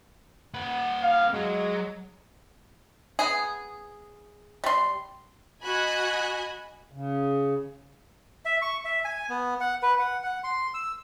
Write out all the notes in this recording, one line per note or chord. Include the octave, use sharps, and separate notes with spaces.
A#3 F#5
F5
F#3 G#3
B3 G#4
G3 C6
F#4 D#5 G#5 B5 F#6 G#6
C#3
E5
C#6
E5
G#5
B3
F#5
B4
F#5
F#5
C6
E6